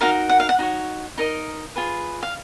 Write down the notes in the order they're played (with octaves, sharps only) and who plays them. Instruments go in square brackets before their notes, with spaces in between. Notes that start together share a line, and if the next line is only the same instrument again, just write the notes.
[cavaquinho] D#4 F#4 A#4 F5
F#5
F5
F#5
D#4 F#4 C#5
D#4 A#4 D#5
F4 G#4 B4
F5